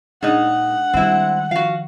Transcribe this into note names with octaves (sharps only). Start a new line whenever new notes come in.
A#2 G#3 D4 D#4 F#5
D#3 G3 C4 E4
F3 F#4 F5